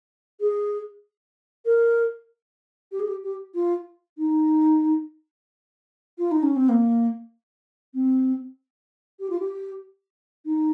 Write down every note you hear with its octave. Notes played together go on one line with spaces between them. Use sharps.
G#4
A#4
G4
G#4
G4
G4
F4
D#4
F4
D#4
C#4
C4
A#3
C4
G4
F4
G4
D#4